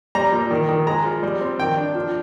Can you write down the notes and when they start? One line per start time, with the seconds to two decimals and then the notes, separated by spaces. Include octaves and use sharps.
0.15 G3 A#5
0.32 A#2
0.51 D#3
0.69 D#3
0.87 G#3 A#5
1.05 F3
1.23 G3
1.41 C4
1.60 D#3 G5
1.77 D4
1.95 F3